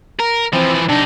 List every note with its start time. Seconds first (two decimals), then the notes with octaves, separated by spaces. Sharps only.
0.19 A#4 A#5
0.53 E3 F3 C4
0.89 C3 D4 D#4